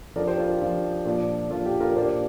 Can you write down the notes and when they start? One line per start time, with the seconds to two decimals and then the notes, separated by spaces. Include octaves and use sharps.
0.16 F3 A#4 D5
0.20 D4
0.27 G4 C5
0.38 F4 A#4
0.49 G4
0.60 F3 D4 F4
1.05 A#2 F3 D4
1.50 A#2 F3 D4 F4
1.66 G4
1.80 F4 A#4
1.95 A#2 A#3 D4 G4 C5